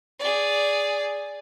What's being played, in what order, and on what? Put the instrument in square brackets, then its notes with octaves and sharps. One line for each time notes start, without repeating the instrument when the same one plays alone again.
[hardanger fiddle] G#4 D5